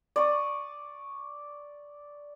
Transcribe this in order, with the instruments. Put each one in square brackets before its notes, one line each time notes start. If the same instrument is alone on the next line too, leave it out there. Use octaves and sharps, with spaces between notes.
[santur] D5 C#6 D#6